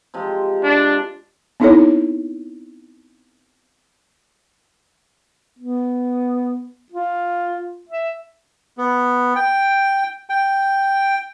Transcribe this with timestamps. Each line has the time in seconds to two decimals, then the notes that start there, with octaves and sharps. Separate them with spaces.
0.14 C3 F3 G#3
0.64 D4
1.60 B3 C4 D#4 E4 A4 C#5
5.59 B3
6.92 F4
7.89 E5
8.78 B3
9.36 G5
10.30 G5